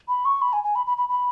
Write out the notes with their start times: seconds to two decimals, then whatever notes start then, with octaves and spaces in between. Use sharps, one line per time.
0.08 B5
0.25 C#6
0.42 B5
0.53 G#5
0.64 G#5
0.75 B5
0.87 B5
0.98 B5
1.09 B5